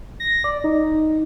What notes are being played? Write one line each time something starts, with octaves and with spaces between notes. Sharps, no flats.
A#6
D5
D#4